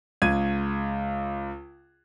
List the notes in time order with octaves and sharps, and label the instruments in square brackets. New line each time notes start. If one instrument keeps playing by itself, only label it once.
[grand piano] C#2 G#6 D#7